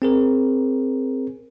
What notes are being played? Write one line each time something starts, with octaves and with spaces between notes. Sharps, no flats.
C4 G#4 A#4